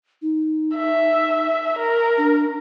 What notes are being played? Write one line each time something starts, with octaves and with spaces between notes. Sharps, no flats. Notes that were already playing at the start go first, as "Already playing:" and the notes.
D#4
E5
A#4
D4